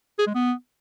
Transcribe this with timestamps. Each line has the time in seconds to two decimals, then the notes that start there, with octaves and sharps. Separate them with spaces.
0.19 G#4
0.27 G#3
0.35 B3